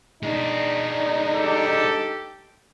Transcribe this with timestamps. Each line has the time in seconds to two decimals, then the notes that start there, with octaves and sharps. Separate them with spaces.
0.23 G#3 D4 D#4
1.33 G4 A4